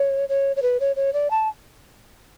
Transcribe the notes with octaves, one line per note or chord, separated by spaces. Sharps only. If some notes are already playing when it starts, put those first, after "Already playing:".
Already playing: C#5
C#5
C#5
B4
C#5
C#5
D5
A5